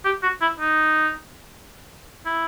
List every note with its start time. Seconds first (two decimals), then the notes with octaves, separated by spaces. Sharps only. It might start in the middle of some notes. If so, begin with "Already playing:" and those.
0.05 G4
0.23 F#4
0.41 E4
0.60 D#4
2.26 E4